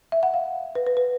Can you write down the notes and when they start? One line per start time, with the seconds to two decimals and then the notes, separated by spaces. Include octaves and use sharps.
0.12 E5
0.23 F#5
0.34 F5
0.75 B4
0.87 B4
0.97 B4